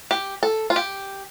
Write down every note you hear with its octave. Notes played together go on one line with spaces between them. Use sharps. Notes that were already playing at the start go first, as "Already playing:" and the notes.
G4
A4
F4
G4